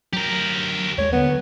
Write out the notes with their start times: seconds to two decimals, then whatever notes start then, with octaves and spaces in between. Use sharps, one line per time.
0.13 F#3 G4 A#4
0.98 D#2 G#3 C#5
1.12 D3 F#3 B3